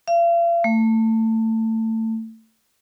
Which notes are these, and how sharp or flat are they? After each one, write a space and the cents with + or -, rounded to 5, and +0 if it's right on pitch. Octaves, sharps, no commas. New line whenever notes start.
F5 -40
A3 +25